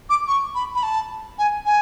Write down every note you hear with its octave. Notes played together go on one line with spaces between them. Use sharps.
D6
C#6
B5
B5
A5
G#5
G#5